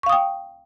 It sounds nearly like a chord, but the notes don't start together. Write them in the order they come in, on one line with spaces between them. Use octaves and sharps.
C#6 F5 D#6 G5